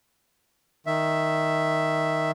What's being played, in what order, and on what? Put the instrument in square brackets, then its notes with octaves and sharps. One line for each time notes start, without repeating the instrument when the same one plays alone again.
[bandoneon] D#3 E5